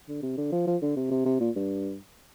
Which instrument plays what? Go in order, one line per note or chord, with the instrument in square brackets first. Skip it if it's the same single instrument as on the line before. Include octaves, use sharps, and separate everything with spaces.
[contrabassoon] D3
C3
D3
F3
F3
D3
C3
C3
C3
A#2
G2